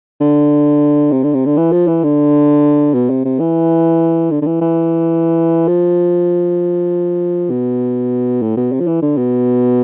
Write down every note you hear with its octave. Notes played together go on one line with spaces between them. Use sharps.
D3
C3
D3
C3
D3
E3
F3
E3
D3
B2
C3
C3
E3
D3
D3
E3
E3
F3
B2
A2
B2
C3
F3
E3
D3
B2